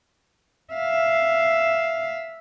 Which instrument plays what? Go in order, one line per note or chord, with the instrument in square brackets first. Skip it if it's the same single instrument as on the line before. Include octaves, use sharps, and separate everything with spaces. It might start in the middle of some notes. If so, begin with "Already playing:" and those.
[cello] E5 F5